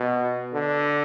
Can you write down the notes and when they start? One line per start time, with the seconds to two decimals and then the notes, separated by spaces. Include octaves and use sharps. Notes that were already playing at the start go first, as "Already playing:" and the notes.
Already playing: B2
0.53 D3